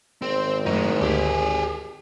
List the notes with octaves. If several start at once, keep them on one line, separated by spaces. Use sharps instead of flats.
G#1 C4
F#2 A2 D#4
D2 G4 G#4